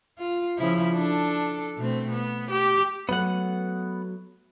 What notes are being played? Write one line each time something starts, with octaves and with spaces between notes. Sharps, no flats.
F4
C#3 F3 E4
D4 A4
B2 A3 C4
B3
G4
F#3 A3 B3 F#5